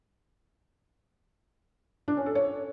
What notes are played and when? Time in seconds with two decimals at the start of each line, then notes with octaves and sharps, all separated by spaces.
2.08 D4
2.17 C#4
2.26 A4
2.35 C#5